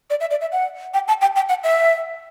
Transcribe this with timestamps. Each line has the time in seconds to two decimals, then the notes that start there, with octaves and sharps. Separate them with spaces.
0.10 D5
0.20 E5
0.31 D5
0.41 E5
0.52 F#5
0.94 G5
1.08 A5
1.21 G5
1.36 G5
1.49 F#5
1.64 E5